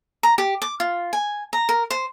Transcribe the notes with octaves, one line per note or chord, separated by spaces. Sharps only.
A#5
G4
D6
F4
G#5
A#5
A#4
C5